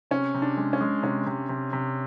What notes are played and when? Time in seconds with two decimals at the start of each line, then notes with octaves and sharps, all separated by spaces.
0.11 C3 C#4
0.35 C3
0.42 D4
0.57 G#3
0.73 C#4
0.81 G#3
1.03 C3 C#4
1.26 C3
1.49 C3
1.73 C3